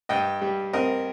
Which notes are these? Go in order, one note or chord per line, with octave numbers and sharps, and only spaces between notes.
G2 D#5 G5
G3
C4 A#4 D#5